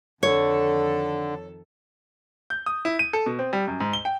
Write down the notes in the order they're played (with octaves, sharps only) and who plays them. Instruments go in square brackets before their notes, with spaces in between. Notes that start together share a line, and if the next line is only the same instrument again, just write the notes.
[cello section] F2 D#3 A4 [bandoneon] D3 [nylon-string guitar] C#5
[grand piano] G6
D#6
E4
D#7
A4
B2
C4
G3
F#2
G#2
G7
G5